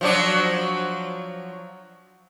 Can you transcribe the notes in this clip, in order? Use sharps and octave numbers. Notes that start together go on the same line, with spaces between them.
F3 F#3 D4